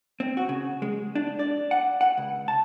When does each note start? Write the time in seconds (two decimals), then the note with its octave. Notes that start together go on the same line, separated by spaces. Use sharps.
0.20 C4
0.37 F#4
0.49 C#3
0.82 G#3
1.15 D4
1.39 D5
1.71 F#5
2.01 F#5
2.18 C#2
2.48 A5